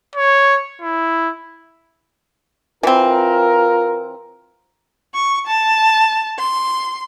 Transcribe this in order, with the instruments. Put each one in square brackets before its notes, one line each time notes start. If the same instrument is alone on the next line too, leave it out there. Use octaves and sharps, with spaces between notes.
[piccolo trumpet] C#5
E4
[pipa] E3 C4 [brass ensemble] F4 A#4
[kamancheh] C#6
A5
C6